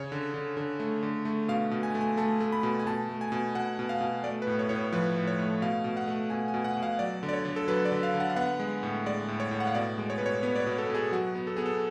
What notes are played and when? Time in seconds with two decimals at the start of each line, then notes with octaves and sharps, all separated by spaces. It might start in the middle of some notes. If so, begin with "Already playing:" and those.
Already playing: C#3 C#5
0.12 D3
0.34 D3
0.57 D3
0.80 A3
1.03 D3
1.25 A3
1.48 B2 F5
1.71 B2
1.83 G#5
1.95 A3
2.01 G#5
2.17 A3 A5
2.40 A3
2.52 B5
2.63 B2
2.79 G#5
2.86 B2 A5
3.09 A3
3.21 G#5
3.32 B2
3.55 B2 F#5
3.79 B2
3.89 F5
4.01 B2
4.24 A3 D5
4.42 B4
4.47 A2
4.59 C#5
4.69 A2 C#5
4.76 B4
4.93 F3 B4
5.16 A2
5.27 C#5
5.39 A3
5.62 B2 F5
5.84 B2
5.97 F#5
6.08 A3
6.30 B2 G#5
6.48 G#5
6.54 B2
6.64 F#5
6.77 B2
6.83 F5
6.99 F#3 D5
7.23 D3
7.29 D5
7.33 C#5
7.45 D3
7.56 A4
7.68 F#3 B4
7.85 D5
7.92 D3
8.03 F5
8.14 D3
8.20 F#5
8.30 F5
8.36 B3 F#5
8.60 G#3
8.83 A2
9.06 G#3 D5
9.28 A2
9.40 C#5
9.51 A2
9.60 F#5
9.67 F5
9.75 B2 D5
9.98 G#3
10.10 C#5
10.18 B2 B4
10.26 C#5
10.43 B3
10.56 D5
10.60 C#5
10.66 B2
10.78 A4
10.90 B2 G#4
11.12 F#3 F#4
11.35 B3
11.47 A4
11.57 B3 G#4
11.66 A4